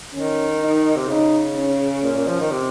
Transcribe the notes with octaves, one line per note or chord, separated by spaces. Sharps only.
D#3 C#4
D#4
C3
C#3 D#4
C#4
A#2
A#2
F3
D#3
C3